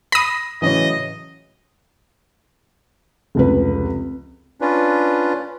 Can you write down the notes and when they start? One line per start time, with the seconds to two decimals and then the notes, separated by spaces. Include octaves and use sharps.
0.12 B5 D#6 A#6
0.62 A2 C#3 E3 F#3 C#4 C#5 D#5
3.35 F1 C#2 B4
4.61 C#4 D4 F4 B4